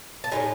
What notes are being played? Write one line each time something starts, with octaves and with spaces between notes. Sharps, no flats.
A5
A2 G#3 D#4 G#5